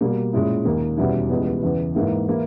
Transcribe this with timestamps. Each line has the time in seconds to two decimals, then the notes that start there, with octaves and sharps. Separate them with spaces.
0.01 B2 G3 A#3
0.33 A#2 G#3 C#4 E4
0.65 D#2 D#3 A#3
0.97 E2 B2 G3 C#4 E4
1.30 C#2 C#3 E3 G3 B3
1.63 E2 C#3 E3
1.95 G#2 E3 A#3 E4
2.28 E3 A#3 E4